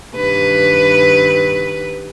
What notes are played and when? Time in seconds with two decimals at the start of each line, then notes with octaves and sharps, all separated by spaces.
0.16 G2 D#3 B4